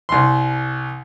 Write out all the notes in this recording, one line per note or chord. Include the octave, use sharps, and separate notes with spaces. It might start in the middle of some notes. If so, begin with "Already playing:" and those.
C2 C6